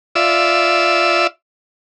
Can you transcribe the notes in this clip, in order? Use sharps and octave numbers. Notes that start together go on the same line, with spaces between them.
F4 D5 E5 E6